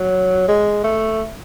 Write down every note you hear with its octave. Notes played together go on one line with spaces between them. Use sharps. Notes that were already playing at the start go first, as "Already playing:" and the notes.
Already playing: F#3
G#3
A3